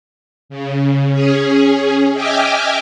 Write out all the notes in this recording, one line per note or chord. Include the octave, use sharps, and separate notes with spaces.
C#3
C#4 G#4
D#5 E5 G5 G#5 D6 F6